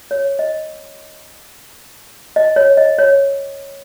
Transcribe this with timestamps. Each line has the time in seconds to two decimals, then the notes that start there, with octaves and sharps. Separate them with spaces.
0.11 C#5
0.39 D#5
2.36 D#5
2.56 C#5
2.77 D#5
2.99 C#5